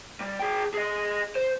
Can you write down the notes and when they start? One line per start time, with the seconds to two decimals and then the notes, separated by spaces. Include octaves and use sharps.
0.21 G3
0.39 G#4 G5
0.74 G#4 D#5
1.35 C5